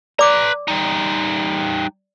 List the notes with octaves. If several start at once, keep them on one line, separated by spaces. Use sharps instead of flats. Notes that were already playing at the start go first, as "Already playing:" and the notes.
B4 D5 A#5 D6
G3 D#4